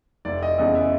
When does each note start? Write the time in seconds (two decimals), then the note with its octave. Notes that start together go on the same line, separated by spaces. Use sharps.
0.25 F1 D5
0.43 D#5
0.58 E2 C#3 D#5
0.75 E5